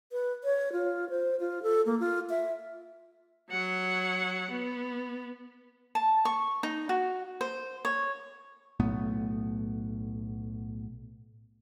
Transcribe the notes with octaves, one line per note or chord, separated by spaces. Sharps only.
B4
C#5
F4
C5
F4
A4
A#3
F4
E5
F#3 F#5
B3
A5
C#6
D#4
F#4
C5
C#5
B1 A2 A3 B3